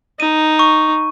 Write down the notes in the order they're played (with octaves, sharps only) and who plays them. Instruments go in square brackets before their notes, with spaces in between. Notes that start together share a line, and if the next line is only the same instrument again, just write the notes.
[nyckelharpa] D#4 [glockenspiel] D#7
[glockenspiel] C#6